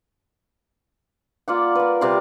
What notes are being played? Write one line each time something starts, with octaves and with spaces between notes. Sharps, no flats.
A#3 F4 D5 F#5
A#4 B4
C3 G3 D5 C6